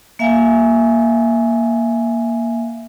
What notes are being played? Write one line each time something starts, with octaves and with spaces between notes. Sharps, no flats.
A#3 E5 F5 G#5